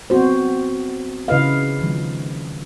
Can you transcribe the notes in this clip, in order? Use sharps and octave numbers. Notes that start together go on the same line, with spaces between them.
B3 C4 F#4 C5
C#3 E4 B4 D#5 F5
D#3 F3 G#3